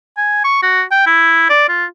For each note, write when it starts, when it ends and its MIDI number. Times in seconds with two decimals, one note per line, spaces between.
0.17 0.40 80
0.44 0.62 85
0.62 0.83 66
0.91 1.04 79
1.06 1.49 64
1.50 1.68 74
1.69 1.85 65